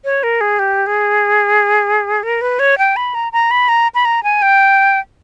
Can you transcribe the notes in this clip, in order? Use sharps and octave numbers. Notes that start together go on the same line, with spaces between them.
C#5
A#4
G#4
G4
G#4
A#4
B4
C#5
G5
B5
A#5
A#5
B5
A#5
B5
A#5
G#5
G5